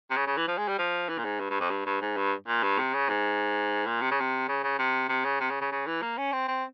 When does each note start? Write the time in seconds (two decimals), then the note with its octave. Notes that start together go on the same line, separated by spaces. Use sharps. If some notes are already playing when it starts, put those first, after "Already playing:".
0.11 C3
0.17 C#3
0.27 C#3
0.37 E3
0.48 F3
0.58 G#3
0.68 G3
0.79 F3
1.09 E3
1.18 A#2
1.24 G#2
1.40 G2
1.50 G2
1.60 F2
1.70 G2
1.86 G2
2.02 G#2
2.17 G2
2.48 A#2
2.63 G2
2.79 C3
2.94 C#3
3.09 G#2
3.86 A#2
4.01 C3
4.11 C#3
4.20 C3
4.48 C#3
4.63 C#3
4.79 C3
5.09 C3
5.25 C#3
5.40 C3
5.50 C#3
5.61 C#3
5.72 C#3
5.87 E3
6.02 A#3
6.18 C#4
6.32 C4
6.48 C4